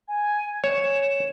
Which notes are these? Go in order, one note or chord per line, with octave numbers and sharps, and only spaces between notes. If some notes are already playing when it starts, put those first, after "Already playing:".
G#5
C#5 E7